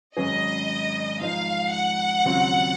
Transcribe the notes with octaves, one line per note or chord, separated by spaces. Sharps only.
G#1 G#2 F#3 C#4 G#4 D#5
G#2 F3 G#3 D#4 F5
F#5
D#2 C#3 F#3 C4 F4